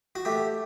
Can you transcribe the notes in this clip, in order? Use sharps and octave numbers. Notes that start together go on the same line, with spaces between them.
F#4
A3 G4